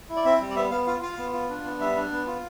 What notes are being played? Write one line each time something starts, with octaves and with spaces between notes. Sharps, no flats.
E4
D5
C4 E5
G3
D5
B3 E5
B3 F5
F4 F5
F4 F5
B3
F4
D4
B3
G3 E5
D4
B3
F4